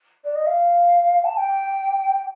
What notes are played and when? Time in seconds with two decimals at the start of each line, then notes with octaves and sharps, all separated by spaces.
0.24 D5
0.35 D#5
0.46 F5
1.24 A5
1.37 G5